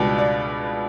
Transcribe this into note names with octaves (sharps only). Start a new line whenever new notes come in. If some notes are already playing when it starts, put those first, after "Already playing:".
Already playing: C#2 B2 G3 D4 D5
D5